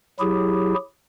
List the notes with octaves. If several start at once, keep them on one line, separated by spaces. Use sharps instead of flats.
F#3 E4 G4 G#4